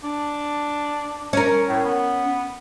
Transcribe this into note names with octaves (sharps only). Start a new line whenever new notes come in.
D4
C#4 A#4
A2
B3